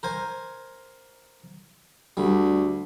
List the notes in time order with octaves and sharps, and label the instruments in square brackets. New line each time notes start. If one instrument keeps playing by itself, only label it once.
[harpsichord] A#4 C5 G#5
[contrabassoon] D2 [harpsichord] G3